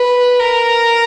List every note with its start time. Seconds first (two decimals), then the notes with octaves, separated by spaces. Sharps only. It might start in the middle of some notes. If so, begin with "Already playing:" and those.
Already playing: B4
0.39 A#4